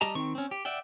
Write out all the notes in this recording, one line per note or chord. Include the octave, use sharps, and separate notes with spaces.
G3 G4 D#5 A5 A#5
D#3 C4 C#6
C4 C#4
G4
D5 E5 F#5 G5